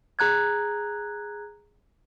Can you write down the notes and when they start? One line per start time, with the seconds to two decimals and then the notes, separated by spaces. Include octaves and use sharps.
0.19 G#4 A#5 F#6 G#6